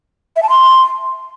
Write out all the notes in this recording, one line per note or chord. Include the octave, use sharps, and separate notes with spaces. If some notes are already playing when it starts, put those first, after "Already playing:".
E5
A5
C6